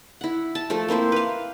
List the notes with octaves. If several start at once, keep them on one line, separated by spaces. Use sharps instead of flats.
E4 F#5
A5
F3 A3 A4
A#3 C4 E4 C5
B4 F5